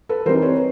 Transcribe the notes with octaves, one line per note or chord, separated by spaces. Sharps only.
A4 B4
E3 G3 C4 D#4 A#4 C5
B4 C#5